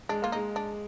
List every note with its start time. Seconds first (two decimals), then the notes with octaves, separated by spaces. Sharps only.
0.09 G#3 D4
0.22 A#3 F4
0.32 G#3 D#4
0.56 D4